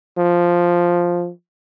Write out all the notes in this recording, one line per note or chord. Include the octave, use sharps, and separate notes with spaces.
F3